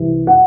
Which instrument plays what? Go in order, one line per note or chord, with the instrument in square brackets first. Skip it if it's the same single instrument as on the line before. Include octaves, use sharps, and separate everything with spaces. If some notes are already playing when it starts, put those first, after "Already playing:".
Already playing: [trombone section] C2 C3 E3
[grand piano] F#5